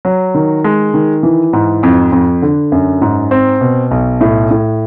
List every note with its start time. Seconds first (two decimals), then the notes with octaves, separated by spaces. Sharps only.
0.05 F#3
0.34 D#3
0.64 G#3
0.94 D#3
1.23 E3
1.53 G#2
1.83 F2
2.12 F2
2.42 D3
2.72 F#2
3.02 G#2
3.31 C4
3.61 B2
3.91 B1
4.21 A2
4.51 A2